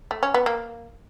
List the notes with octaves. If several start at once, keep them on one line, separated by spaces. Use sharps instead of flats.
A3
C#4
B3
A#3